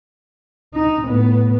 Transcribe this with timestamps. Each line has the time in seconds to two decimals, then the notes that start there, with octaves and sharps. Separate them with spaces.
0.74 D#4
1.05 A2 B3